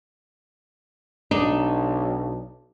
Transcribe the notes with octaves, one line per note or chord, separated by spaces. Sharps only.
B1 D4 D#4